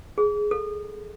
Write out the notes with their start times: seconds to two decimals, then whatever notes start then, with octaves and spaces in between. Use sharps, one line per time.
0.18 G#4
0.51 A4